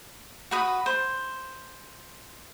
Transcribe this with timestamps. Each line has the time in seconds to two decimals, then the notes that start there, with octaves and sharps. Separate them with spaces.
0.51 F#4 B4 D#6
0.86 C5